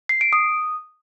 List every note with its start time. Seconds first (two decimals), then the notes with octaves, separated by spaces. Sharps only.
0.09 C7
0.21 D7
0.33 D#6